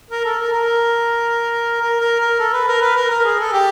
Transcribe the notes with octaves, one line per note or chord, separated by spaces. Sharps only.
A#4
A4
A#4
A#4
A#4
A#4
A#4
A4
B4
A#4
B4
A#4
A#4
G#4
A4
G4